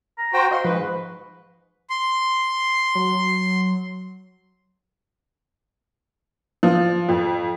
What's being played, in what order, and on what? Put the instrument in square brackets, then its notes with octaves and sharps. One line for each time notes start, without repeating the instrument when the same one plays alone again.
[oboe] A#5
[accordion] F#4 C5 G5
[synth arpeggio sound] D#5 F5 C#6 [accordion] C6
[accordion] G#2 [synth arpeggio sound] F3 [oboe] B4
[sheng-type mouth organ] C6
[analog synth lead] F#3
[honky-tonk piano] F3
F2